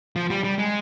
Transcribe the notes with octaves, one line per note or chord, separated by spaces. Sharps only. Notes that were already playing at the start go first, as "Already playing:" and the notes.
F3
G3
G3
G#3